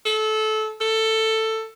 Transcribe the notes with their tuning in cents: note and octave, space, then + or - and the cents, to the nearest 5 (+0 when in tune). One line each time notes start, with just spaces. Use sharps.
A4 -20
A4 +10